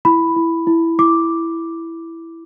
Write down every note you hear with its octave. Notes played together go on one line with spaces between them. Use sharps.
E4 B5
E4
E4
E4 D6